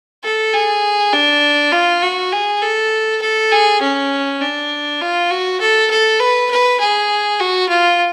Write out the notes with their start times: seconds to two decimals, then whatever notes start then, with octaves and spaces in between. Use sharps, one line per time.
0.24 A4
0.54 G#4
1.13 D4
1.72 F4
2.03 F#4
2.32 G#4
2.62 A4
3.22 A4
3.52 G#4
3.82 C#4
4.41 D4
5.01 F4
5.31 F#4
5.61 A4
5.91 A4
6.20 B4
6.51 B4
6.80 G#4
7.40 F#4
7.69 F4